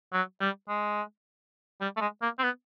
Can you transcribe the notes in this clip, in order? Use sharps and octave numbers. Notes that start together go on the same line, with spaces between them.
F#3
G3
G#3
G3
A3
G#3
A#3
C4
B3